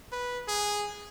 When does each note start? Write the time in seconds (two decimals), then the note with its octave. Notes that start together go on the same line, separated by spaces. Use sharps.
0.12 B4
0.48 G#4